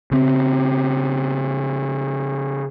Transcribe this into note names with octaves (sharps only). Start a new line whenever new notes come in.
C#3 C4